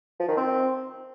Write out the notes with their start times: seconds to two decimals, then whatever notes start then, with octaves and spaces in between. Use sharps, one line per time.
0.19 F3
0.28 D#3
0.37 C4